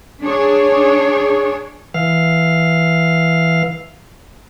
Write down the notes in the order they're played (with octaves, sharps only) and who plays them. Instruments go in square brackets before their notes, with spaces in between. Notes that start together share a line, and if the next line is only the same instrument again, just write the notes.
[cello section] D4 G#4 C#5
[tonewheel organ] E3 F5